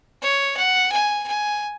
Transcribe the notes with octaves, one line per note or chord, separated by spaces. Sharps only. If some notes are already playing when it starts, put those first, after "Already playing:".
C#5
F#5
G#5
G#5